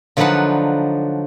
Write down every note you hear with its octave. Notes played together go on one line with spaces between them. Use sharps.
D3 F3 F#3 D#4 B4 F#5